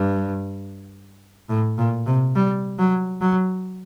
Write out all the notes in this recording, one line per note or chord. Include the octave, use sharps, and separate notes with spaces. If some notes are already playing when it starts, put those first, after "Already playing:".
Already playing: G2
A2
A#2
C3
G3
F#3
F#3